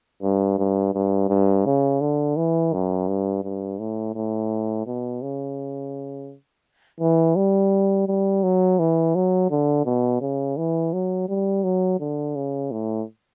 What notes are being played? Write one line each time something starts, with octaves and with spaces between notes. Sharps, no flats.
G2
G2
G2
G2
C#3
D3
E3
F#2
G2
G2
A2
A2
B2
C#3
E3
G3
G3
F#3
E3
F#3
D3
B2
C#3
E3
F#3
G3
F#3
D3
C#3
A2